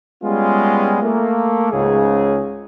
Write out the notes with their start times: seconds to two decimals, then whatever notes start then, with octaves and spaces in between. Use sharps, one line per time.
0.24 G3 G#3 B3 C#4 F4
1.03 A3 A#3
1.72 C#2 G#2 C#3 G#4